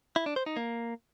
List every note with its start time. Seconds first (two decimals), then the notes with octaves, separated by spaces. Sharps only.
0.16 E4
0.26 D4
0.36 C5
0.46 D#4
0.57 A#3